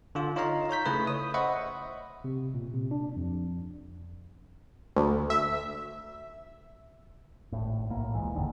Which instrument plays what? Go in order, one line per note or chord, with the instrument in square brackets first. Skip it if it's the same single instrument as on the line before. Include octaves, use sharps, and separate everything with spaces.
[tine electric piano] D3 F4
D#4 F4 C#5 D#5 F5 A#5
C#5 A#5 G6 B6
C#3 A3 E4 B4 B5
C#5 D#6
C5 D#5 E5 F#5 B5 C#6
C3
A#2
C3
D4
F2
[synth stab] D2
E5
[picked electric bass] G#1 A2
B1 A2 A#3
D#1 G#2 E3
G1 E2 D3 D#3